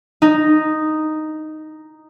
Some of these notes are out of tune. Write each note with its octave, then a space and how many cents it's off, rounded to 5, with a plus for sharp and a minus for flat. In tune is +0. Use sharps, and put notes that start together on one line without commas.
D#4 -5